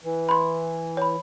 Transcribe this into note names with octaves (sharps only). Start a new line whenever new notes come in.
E3
B5 C6
C#5 B5